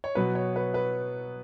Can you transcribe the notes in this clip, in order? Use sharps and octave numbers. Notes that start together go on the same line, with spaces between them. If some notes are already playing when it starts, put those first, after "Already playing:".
C#5
B2 F#3 B3 B4
C#5
B4
B4